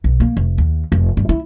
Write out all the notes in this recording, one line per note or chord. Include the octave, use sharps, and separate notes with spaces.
B1
A#3
F1
D#2
F1
G2
E4